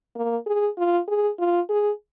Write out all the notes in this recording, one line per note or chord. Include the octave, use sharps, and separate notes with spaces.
A#3
G#4
F4
G#4
F4
G#4